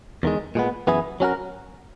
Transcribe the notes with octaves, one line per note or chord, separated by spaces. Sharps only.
E2 D#3 G#3
A#2 G#3 B3
F#2 E3 B3 E4 G#4
F#3 C#4 F#4 A#4